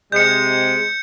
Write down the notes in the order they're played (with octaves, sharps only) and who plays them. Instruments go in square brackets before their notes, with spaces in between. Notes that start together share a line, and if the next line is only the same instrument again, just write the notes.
[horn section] C3 G#3 [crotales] G6 C#7